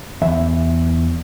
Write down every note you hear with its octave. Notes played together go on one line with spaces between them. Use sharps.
E2 E5